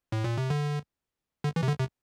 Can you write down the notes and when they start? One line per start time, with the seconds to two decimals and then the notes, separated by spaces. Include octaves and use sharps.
0.12 A2
0.24 A#2
0.38 C3
0.50 D3
1.44 D3
1.56 E3
1.63 C3
1.68 D3
1.79 C3